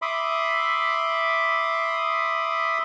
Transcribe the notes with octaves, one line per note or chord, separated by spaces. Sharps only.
E5 B5 C6 D6 D#6